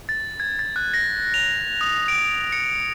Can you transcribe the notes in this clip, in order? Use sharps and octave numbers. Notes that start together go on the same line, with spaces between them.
A6
G#6
A6
F#6
A#6
F7
D#6
D7
C#7